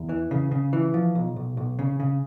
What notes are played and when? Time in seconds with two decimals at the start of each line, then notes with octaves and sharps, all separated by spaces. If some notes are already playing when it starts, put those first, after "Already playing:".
Already playing: E2
0.09 E3
0.31 C#3
0.51 C#3
0.73 E3
0.94 F3
1.15 B1
1.36 B1
1.57 B1
1.79 C#3
2.00 C#3